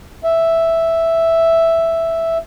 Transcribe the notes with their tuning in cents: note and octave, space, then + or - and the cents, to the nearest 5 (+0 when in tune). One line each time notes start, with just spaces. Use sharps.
E5 +0